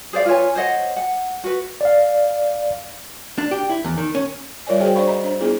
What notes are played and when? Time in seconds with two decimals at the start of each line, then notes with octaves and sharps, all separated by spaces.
0.13 G#4 C5 D5 F5
0.26 F4 B4 C#5 G#5
0.55 C5 C#5 D#5 F#5
0.96 F#5
1.44 F#4 B4
1.81 D5 F5
3.38 D4
3.51 G4
3.69 E4
3.85 E2
3.98 D#3
4.15 C#4
4.67 G3 F4 A#4 C#5 D5 G#5
4.80 F#4 G#4 C5 D#5 G5 G#5
4.96 D4 C5 D5 F5 B5 C#6
5.08 D#5 A#5
5.24 D4 C5
5.41 B3 D4 E4 F4 G#4